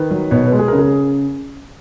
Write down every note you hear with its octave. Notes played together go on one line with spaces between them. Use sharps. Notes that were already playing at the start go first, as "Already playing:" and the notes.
Already playing: D#3 B4
F#3
B2 C#5
B4
G#3
G#4
C#3 A#4
G#4